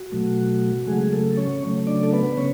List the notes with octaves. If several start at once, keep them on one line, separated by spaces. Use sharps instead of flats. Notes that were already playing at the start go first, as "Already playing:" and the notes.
Already playing: F#4
B2 F#3 A3
C#3 F#3 G#3 A3 G#4
A3 A4
C#4 C#5
C#3 F#3 A3
D4 D5
A4
B3 B4
C#3 C#4 C#5